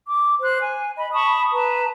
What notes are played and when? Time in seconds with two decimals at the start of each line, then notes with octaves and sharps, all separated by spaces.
0.07 D6
0.40 C5 F#6
0.60 G#5
0.96 D#5 B5
1.13 A5 B5 C#6 D#6
1.52 B4 A5 A#5